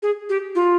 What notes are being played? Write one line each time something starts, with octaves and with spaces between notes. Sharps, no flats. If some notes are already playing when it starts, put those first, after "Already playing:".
G#4
G4
F4